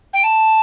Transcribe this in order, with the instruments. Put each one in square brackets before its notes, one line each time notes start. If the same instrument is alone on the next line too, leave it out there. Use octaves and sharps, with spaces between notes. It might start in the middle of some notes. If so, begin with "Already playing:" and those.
[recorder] G5
A5